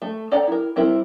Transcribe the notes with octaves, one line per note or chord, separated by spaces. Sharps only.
A3
A4 D5 F#5 G5 A#5
E4 A#4
G3 C4 E4 A#4